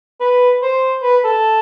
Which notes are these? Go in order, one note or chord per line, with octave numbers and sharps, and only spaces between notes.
B4
C5
B4
A4